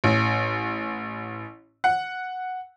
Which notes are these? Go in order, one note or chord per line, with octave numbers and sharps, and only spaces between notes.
A1
F#5